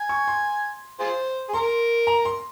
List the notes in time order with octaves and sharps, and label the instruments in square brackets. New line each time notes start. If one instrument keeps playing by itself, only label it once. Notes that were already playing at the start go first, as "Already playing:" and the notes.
Already playing: [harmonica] G#5
[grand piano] C#6
C6
[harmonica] F4 G#4 C5
G#4
[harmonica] A#4 [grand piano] C6
[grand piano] A#5
C6